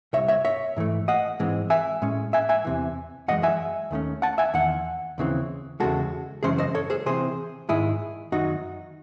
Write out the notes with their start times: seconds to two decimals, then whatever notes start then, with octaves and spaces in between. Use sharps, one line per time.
0.13 C2 C3 C#5 E5
0.28 C#5 E5
0.45 C#5 E5
0.76 G#2 E3 A3
1.08 D#5 F#5
1.39 G#2 E3 G#3 C4
1.70 E5 G#5
2.02 A2 G#3 C#4
2.33 E5 G#5
2.49 E5 G#5
2.65 E2 C3 E3
3.28 F#2 E3 G#3 D#5 F#5
3.43 E5 G#5
3.91 D#2 D#3 A3 C#4
4.22 F#5 A5
4.38 E5 G#5
4.54 E2 D#3 F#5
5.18 D#2 C#3 E3 C4
5.80 E2 C#3 G#3 F#4 A4
6.43 F#2 C#3 E3 G#3 C#4 G#4 C5
6.58 C5 D#5
6.75 A4 C#5
6.90 G#4 C5
7.06 C3 E3 C4 G#4 C5
7.69 G#2 D#3 G#3 E4 G#4
8.32 F#2 D#3 F#3 D#4 F#4